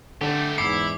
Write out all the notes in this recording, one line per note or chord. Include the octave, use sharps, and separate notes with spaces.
D3 A3 G4
E2 G#2 E4 D6 C7